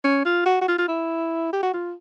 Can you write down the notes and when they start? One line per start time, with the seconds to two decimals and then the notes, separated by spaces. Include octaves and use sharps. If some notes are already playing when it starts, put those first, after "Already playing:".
0.04 C#4
0.25 F4
0.46 F#4
0.61 F#4
0.68 F4
0.78 F4
0.88 E4
1.53 G4
1.63 F#4
1.74 F4